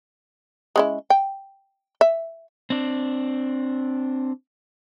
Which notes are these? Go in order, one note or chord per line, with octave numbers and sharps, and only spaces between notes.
G#3 C#4 E4
G5
E5
C4 D4